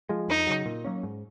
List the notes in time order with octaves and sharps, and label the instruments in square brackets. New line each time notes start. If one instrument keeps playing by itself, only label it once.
[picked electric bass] F3 G#3
[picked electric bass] F2 [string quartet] D#4
[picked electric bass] C#3 F#3
A#2
F#3 A#3 C#4
G#2